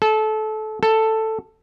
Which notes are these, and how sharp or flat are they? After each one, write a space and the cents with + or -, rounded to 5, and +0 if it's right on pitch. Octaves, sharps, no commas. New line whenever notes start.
A4 -25
A4 +5